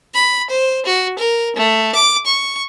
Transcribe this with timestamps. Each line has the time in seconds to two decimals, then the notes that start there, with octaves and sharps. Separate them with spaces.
0.14 B5
0.50 C5
0.86 F#4
1.18 A#4
1.56 A3
1.95 D6
2.26 C#6